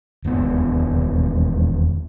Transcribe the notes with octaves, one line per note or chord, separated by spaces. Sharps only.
E1 D#2 B3